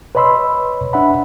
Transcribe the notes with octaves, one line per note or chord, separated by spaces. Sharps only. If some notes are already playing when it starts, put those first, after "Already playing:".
B4 C#5 D#5 B5 C6 E6
D4 E5 F#5 B5